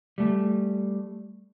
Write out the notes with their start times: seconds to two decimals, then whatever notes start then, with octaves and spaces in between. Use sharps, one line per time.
0.18 G3 A3